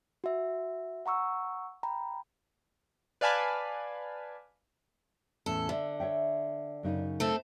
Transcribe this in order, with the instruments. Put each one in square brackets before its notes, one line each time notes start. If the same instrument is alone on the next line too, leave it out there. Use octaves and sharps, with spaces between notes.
[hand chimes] F#4 E5
F#5 A#5 C#6 E6
G5 A#5 B5
[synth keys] B4 D5 F5 G#5 A5 B5
[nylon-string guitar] E2 A2 C#4 [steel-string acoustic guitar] A4
[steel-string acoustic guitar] D3 [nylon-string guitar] E5
[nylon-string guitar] C#5 E5 G5
F#2 C#3 D#4
[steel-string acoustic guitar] A3 C4 A4